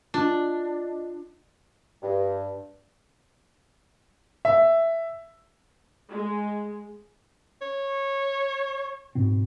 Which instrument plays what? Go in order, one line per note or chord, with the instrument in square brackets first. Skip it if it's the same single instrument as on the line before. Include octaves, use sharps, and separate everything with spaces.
[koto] D4 [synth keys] F4 D5 D#5
[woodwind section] G2
[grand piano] E5
[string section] G#3
[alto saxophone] C#5
[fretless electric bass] G#2 B2 C4